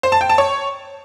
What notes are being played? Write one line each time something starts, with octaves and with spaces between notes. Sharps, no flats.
C5
A5
G5
A5
C#5